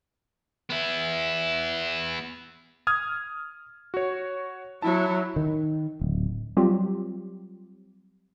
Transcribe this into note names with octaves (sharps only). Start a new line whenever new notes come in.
B3 E4
D#6 F6 G#6
F#4 C#5
F#3 E4 A5
D#3
D1
F#3 G3 C4 F4 G4